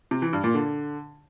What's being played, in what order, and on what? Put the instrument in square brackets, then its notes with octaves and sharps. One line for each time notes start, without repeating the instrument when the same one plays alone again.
[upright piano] C3
E3
G2
A#2
D3